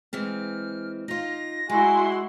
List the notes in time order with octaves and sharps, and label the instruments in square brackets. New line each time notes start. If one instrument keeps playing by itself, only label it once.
[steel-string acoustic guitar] E3 G#3 C4 [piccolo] F6
[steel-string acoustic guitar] D#4 F4 [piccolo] A#6
[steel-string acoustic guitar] G#3 [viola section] E4 F#4 C6 [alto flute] G#5